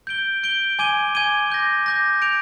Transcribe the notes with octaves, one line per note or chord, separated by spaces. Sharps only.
G6 D7 G7
G6 D7 G7
G#5 D6 G#6 D#7 G7
G#5 D6 G#6 D#7 G7
D6 G6 A#6
D6 G6 A#6
G6 D7 F7